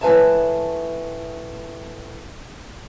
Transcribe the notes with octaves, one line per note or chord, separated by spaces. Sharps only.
A2 F3 B4 E5 G#5 A5